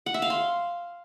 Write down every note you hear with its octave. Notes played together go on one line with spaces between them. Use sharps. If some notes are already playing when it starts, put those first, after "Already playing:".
F#5
E5
F5
C6